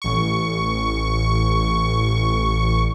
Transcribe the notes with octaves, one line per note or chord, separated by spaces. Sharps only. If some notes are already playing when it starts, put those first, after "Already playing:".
A1 C#6